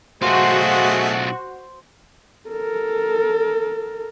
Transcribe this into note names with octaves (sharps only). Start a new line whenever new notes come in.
B1 A3 F4 F#4 G#4 C5 D#5
A4 A#4